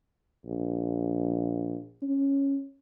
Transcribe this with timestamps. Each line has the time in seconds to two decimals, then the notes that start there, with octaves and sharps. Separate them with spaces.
0.46 A#1
2.02 C#4